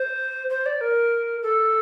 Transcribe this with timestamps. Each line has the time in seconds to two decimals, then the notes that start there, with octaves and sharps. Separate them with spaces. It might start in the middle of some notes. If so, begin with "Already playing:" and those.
Already playing: C5
0.50 C5
0.66 D5
0.81 A#4
1.43 A4